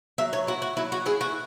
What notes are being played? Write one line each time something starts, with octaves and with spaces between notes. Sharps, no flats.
F#3 E5
C#5
E4 F#4
F#4
F#3 E4
F#4
E4 G#4
F#4